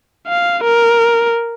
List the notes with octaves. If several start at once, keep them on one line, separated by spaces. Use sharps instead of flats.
F5
A#4